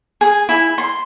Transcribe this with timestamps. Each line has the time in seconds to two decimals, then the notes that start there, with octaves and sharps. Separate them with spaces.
0.21 G#4
0.49 E4
0.78 C6